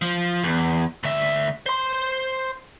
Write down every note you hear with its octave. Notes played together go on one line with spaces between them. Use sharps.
F3
E2
D2 E5
C5 C6